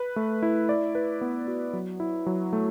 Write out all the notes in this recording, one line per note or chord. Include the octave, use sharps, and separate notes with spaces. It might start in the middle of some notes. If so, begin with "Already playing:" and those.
Already playing: B4
A3
E4
D5
B4
B3
F#4
F#3
E4
F#3
A3